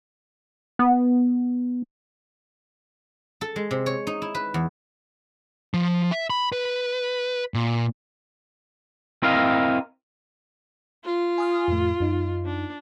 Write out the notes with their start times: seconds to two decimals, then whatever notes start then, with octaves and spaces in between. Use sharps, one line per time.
0.79 B3
3.41 A4
3.56 G#3
3.71 C3
3.86 C#5
4.07 D#4
4.22 E4
4.35 B4
4.54 E2
5.74 F3
6.11 E5
6.30 B5
6.52 B4
7.54 A#2
9.23 C4 E4 A#4 D#5 F5
11.04 F4
11.38 G#5 D#6 F6
11.68 F2 A2 A3
12.00 F#2 D#4
12.45 D4